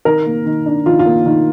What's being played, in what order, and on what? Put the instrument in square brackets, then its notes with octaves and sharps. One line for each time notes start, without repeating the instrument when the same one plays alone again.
[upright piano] D#3 A#4
A#3
D#3
D4
D#3 F4
F4
A#3
D#3